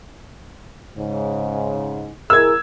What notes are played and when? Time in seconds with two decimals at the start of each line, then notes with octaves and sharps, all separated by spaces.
0.97 G#2 C#3
2.30 E4 G#4 A#4 E6 G#6